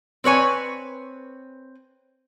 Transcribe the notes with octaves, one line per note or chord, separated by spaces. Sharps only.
C4 B4 C#5 G#5